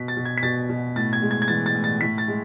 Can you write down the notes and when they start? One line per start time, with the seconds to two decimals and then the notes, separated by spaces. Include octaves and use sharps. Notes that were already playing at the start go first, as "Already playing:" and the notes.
Already playing: B2 B6
0.08 A6
0.17 B2
0.25 G#6
0.38 B6
0.43 B2 A6
0.69 B2
0.96 A2 A6
1.13 G#6
1.22 G#3
1.31 G#6
1.42 G#6
1.48 E3 A6
1.66 A6
1.75 A2
1.84 A6
2.01 A2 B6
2.18 A6
2.28 G#3